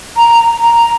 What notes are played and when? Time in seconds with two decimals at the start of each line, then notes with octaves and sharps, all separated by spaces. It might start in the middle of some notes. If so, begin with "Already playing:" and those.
0.17 A#5
0.62 A#5